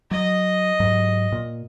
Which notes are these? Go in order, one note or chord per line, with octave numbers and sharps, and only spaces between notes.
F#3 D#5
G#2 F#3
A#2